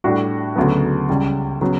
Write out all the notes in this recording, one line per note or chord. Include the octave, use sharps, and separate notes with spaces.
A2 G3 D4 F#4
D2 C#3 F#3 B3
C#2 C#3 G3
C#3 F#3 B3